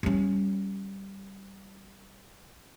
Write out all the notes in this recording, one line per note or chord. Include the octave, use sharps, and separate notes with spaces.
G3 C#4